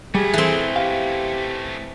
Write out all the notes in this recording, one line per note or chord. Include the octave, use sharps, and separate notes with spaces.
G3 A3 C#4 G#4
E3 C4 A4
G4 F5